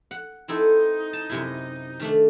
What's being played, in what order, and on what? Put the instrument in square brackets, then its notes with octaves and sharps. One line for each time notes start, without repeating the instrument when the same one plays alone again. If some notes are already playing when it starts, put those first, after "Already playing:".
[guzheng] F#5
[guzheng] C4 E4 A4 [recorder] D#4
[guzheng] A5
F#2 C3 E4
D#3 A3 D4